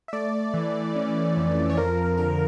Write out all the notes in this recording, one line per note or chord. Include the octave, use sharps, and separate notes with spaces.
E5
A3 D5
E3
C#4
F2
C#5
F3 A#4
A#4
D3 A#4